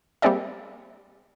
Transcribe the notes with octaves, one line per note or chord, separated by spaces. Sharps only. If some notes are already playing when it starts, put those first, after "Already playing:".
G3 A#3 C4 G#4 D5 E5